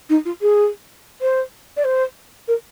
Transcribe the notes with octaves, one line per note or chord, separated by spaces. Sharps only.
D#4
F4
G#4
C5
D5
C5
A#4